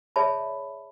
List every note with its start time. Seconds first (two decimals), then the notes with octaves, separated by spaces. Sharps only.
0.16 G#4 C#5 D5 E5 A5 B5